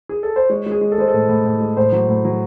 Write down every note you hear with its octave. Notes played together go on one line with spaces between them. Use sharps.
G#4
A4
C5
G#3 C#5
G#3
G#4
G#3
A4
G#3 C5
A4
A2
A2
A2
G#3
A2 C5
F#3
A2
F#3